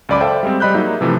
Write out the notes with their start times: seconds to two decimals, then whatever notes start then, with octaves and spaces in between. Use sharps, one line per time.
0.09 C#2 F#2 D5 B5 D6
0.21 A4 C5 E5 F5 G5 A5
0.43 G3 G#3 C4
0.60 G3 D#5 B5 F#6 G6
0.74 F#3 A#3 D#4 G#4 E5
1.01 C3 E3 F3 A3